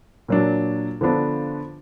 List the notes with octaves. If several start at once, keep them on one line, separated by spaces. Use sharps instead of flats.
A#2 F#3 D4
D3 F3 B3 D4